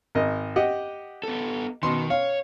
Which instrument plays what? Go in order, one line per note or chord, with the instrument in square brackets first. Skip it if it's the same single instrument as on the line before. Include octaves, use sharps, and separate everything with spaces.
[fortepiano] G#1 A#4 D#5
G4 D#5 F#5
[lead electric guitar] B3 A4
[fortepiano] B2 C6 [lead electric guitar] D#3
[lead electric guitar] C#5 [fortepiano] F5